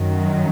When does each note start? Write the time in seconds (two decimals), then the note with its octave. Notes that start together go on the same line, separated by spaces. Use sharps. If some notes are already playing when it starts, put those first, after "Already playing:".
Already playing: F#2 D#3 F#3